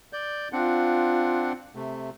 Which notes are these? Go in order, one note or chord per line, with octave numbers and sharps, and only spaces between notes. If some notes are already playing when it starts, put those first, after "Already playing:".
D5 G6
C4 D4 F4 F#5
C3 A3